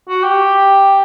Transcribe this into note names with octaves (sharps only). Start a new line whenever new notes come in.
F#4
G4